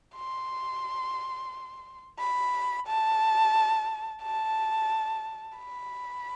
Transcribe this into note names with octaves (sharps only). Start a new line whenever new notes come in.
C6
B5
A5
A5
B5